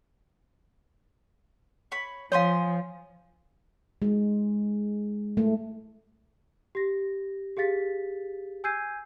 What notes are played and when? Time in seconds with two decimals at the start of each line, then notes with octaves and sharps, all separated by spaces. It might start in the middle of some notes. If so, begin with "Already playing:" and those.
1.92 C#5 B5
2.32 F3 C#5 F5 G#5 C6 D#6
4.02 G#3
5.37 A3
6.75 G4 A#6
7.57 G4 G#4 F5 A6 B6
8.64 G#5 E6 G6 G#6 C7 D#7